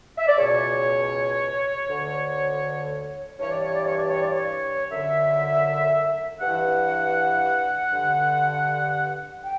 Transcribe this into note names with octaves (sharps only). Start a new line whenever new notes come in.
E5
D5
C#2 B2 C#5
D2 D3
G2 E3 C#5
D5
C#5
D5
C#5
D5
C#5
D5
C#5
F#2 D3 E5
G2 E3 F#5
G2 D3
G5